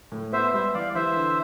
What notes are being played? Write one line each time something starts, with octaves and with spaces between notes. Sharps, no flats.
A2
B3 C5 E5
G3 C5 E5
E3 D5 F5
E3 C5 E5
D3